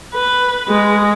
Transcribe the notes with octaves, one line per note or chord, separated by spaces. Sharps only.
B4
G#3